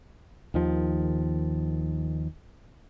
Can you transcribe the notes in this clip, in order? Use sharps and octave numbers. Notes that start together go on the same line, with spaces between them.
D#2 D#3 F3